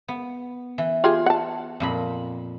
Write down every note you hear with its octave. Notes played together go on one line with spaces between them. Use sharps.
B3
E3
F4 G4 G#4
F#5 A5
F2 A#2 B5